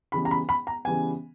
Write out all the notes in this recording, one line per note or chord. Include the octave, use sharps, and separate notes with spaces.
C#3 E3 G3 B3 B5
A#5
B5
B5
A#5
C#3 E3 G3 B3 G#5